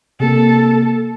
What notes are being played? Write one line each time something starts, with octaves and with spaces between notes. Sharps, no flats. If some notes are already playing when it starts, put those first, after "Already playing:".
C3 A#3 A4